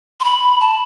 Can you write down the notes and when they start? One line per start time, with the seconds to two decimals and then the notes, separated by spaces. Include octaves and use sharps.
0.20 C6
0.24 B5
0.60 A5